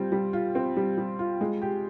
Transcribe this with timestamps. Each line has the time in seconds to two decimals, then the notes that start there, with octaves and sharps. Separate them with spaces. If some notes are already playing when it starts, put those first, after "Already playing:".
Already playing: G3 C4 F4
0.12 G3
0.33 F4
0.55 C4
0.77 G3
0.98 G3
1.19 F4
1.41 G#3
1.62 G4